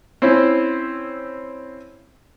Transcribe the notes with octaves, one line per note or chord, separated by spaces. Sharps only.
C4 C#4 E4